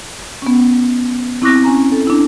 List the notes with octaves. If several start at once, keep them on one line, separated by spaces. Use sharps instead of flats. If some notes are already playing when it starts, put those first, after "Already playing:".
B3 C#4
C4 E4 C#6 D6 F#6 A#6
C#4 G#5 A#5
A4
D4 E4